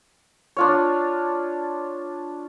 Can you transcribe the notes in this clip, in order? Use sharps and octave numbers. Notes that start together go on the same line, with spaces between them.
D4 F4 C#5